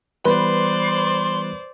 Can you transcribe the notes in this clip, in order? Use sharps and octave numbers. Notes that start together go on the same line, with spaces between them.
E3 G3 B3 B4 C5 D5 C6